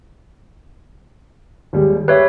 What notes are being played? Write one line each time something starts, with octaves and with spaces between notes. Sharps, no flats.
D#2 G3 G#3
G4 B4 C#5 E5